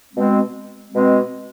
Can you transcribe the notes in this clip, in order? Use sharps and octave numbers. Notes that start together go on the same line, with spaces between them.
B2 G#3 C4
B2 G#3 C4